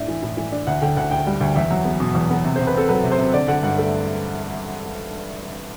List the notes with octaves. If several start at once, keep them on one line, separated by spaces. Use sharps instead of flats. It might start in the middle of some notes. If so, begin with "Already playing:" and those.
Already playing: A2 D4 E5
E3
A2
E3
D4
D2 F#5
D3 G5
D2 F#5
D2 G5
G3
D2
E2 E5
F#3
B3
B2
E2
B3
C3
C3 C5
B4
C4 A4
F#3 B4
C3
C5
C3
D3 D5
D3 F#5
G2 F#5
A3 E5